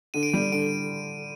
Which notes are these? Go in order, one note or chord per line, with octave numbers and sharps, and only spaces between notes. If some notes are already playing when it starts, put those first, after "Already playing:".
D3 D#7
D7
G3 D#7
D3 D7